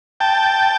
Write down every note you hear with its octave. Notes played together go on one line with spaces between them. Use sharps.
G5 A5